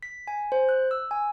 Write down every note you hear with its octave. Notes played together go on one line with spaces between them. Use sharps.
B6
G#5
C5
F#6
E6
G#5